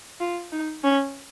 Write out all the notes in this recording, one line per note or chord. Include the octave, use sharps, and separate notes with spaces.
F4
D#4
C#4